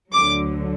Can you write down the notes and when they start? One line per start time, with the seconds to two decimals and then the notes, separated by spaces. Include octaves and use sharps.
0.13 D2 D3 F#3 D6